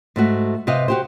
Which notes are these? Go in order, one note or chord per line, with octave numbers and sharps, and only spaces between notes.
G#2 A3 F#4
C3 B4 C5 D#5 F5
F#4 G4 C5